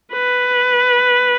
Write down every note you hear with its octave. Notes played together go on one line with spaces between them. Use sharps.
B4